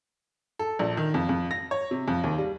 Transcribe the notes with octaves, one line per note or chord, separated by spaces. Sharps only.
A4
A#1
D#3
F2
F2
A#6
C#5
C3
F2
D#2
G3